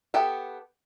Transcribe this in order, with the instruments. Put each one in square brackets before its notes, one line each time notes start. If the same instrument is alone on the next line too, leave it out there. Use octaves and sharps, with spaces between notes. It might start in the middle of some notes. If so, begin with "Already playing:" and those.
[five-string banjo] B3 G4 A4 E5